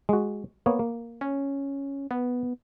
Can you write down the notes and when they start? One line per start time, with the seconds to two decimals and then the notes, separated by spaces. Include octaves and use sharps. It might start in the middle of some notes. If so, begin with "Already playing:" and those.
0.09 G#3 F#4
0.66 A#3 B3 C#5
0.79 A#3
1.21 C#4
2.11 B3